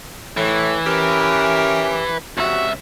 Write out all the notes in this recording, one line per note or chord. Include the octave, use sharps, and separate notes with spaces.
A2 E3
C#4 G4 A#4
C#2 C3 F#4 E5